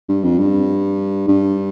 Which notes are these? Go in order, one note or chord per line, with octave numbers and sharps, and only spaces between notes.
G2
F2
G2
G2